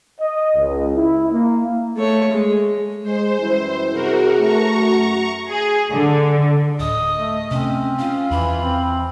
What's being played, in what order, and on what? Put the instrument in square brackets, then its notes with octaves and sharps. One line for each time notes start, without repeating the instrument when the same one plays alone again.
[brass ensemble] D#5
C#2
E4
A#3
[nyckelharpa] A3 C#5
G#3
[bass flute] G#3 [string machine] C5
[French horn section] F#2 E3 G3 [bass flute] E4
[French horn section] C3 G#4 [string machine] F#4 A#4
[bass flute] A3 [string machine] A#5 C#6
[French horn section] F#2 F#4
[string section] G#4
D3
[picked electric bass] D1 [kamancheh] D#5 [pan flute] D#6
[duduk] A3
[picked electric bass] C3 A3 [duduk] C4 [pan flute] C#4
[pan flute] C#4 [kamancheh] F4
[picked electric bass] E2 [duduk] E3 [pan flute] B5
[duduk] C4